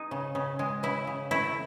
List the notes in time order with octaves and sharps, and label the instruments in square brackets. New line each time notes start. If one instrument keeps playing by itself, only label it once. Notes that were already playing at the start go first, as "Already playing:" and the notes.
Already playing: [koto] G#3 D#4
C#3
C#3
G#3
C#3 E4
C#3
A3 E4